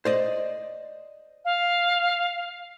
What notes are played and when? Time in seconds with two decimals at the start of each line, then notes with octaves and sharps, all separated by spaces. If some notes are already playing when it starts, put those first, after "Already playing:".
0.05 C5 D5 D#5
1.45 F5